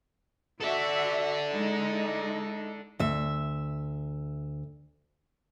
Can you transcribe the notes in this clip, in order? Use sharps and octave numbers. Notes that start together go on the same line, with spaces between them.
F#4 A4 D5 E5
G#3 D#4 E4
D2 E5